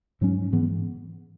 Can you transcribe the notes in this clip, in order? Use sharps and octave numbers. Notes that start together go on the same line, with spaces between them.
G#2 F#3 C#4
G#2 E3 B3